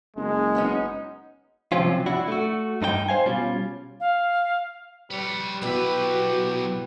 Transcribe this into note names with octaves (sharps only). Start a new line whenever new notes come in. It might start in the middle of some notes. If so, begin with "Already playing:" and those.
F#1 G#3
B3 C#4 D#4
C3 F3 F#3 C4 C#4 F4
D4 E4 F#4
A3 F#4
G2 D#4 B4 G5
C5 F5 G#5
B2 G3 C#4 F4
F5
G3 B4 C#5
B1 B3 E4 F#4 G4 B4